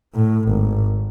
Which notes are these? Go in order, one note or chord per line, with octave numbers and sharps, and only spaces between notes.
A2
G#1